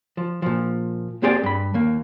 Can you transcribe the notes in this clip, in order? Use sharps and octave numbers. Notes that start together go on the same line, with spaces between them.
F3
A#2 F3
A#3 C4 G4 G#4 D5
G2 B5
D#2 A#3